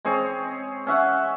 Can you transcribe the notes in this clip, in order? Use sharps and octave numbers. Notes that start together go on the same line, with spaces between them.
G#3 C4 G#4 C#5
C#4 E5 F#5